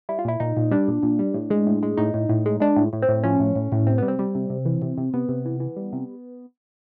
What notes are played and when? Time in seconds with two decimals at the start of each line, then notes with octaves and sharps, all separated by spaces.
0.09 G3 E4
0.19 F4
0.25 A#2 E4
0.40 A#2 D#4
0.57 A#2
0.71 G3 D4
0.88 A#2
1.03 A#2
1.19 G3
1.34 A2
1.50 G#3
1.67 A2
1.83 G#3
1.97 A2 D#4
2.14 A2
2.29 A2
2.46 G#3
2.60 G#3 D4
2.76 A2
2.93 A2
3.02 C4
3.09 A2
3.23 F3 C#4
3.40 A2
3.56 A2
3.72 A2
3.87 C3 C4
3.98 G3 B3
4.08 C4
4.19 G3
4.35 C3
4.50 C3
4.65 E3
4.82 C3
4.98 C3
5.14 C3 B3
5.29 C3
5.45 E3
5.60 E3
5.77 G3
5.93 C3